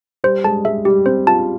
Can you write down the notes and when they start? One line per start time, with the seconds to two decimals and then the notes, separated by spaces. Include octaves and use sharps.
0.24 G3 C5
0.44 G#3 A5
0.65 G#3 E5
0.85 G3 G4
1.06 C4 C5
1.27 F4 A5